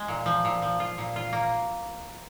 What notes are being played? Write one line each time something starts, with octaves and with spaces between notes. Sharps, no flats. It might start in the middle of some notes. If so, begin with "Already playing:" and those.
Already playing: G#3
A#2
F3
A#2
F3
F4
A#2
F4
A#3